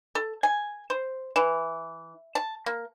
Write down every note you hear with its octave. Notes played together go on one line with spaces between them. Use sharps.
A4
G#5
C5
E3
A5
A#3